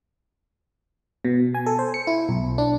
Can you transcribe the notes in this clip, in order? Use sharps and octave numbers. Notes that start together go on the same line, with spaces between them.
B2
G#5
A4
C5
C#7
E4
B1
D4